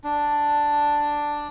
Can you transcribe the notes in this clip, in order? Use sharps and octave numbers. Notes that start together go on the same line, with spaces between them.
D4